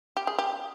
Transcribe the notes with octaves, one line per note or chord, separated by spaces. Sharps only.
G4
G#4
G4